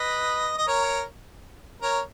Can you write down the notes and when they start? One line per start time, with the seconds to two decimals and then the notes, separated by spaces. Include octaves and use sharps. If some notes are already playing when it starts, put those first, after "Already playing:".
Already playing: B4 D#5
0.58 D#5
0.67 A#4 C#5
1.82 A#4 C#5